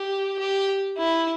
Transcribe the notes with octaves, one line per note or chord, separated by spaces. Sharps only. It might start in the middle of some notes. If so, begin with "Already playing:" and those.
Already playing: G4
G4
E4